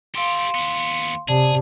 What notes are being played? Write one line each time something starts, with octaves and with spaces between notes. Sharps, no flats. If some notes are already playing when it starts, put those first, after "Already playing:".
G4 A4 F5 C6
D#2 B3
C3 G#4 D5 A5